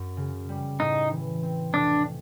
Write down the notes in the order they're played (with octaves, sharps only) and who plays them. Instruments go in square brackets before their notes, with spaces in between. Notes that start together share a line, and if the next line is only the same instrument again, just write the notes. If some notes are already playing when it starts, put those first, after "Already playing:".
Already playing: [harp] F#2
C#3
G3
[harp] A2 [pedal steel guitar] D#4
[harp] E3
C4
[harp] F1 [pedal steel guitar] D4